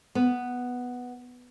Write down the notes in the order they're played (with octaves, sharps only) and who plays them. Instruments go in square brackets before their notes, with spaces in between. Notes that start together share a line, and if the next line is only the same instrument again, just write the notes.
[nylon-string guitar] B3